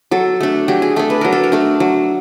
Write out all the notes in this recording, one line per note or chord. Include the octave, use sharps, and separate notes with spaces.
F#3 A4
A3 D4
F#3 G4
G#4
A3 D4 A4
B4
F#3 A#4
A4
A#4
A3 D4
F#3